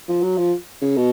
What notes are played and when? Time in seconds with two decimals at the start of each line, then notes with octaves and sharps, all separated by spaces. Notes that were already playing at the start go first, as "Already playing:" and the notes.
0.08 F3
0.23 F#3
0.38 F3
0.81 C#3
0.97 B2